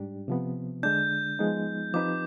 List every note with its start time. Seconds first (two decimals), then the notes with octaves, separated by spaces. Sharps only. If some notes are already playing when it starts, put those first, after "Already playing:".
Already playing: G#2 G3 D4 G4
0.28 C3 F3 B3
0.83 D3 G#3 D4 G6
1.39 F3 G#3 B3 D#4
1.94 F3 C4 D#4 G4 B4 D6